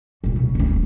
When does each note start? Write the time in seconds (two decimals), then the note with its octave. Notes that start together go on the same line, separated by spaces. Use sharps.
0.24 A#2 A3
0.37 C#3
0.55 A3 C#4
0.71 D#1